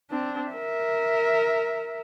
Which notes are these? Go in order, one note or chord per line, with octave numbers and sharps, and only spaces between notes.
C4 D4
A#4 E5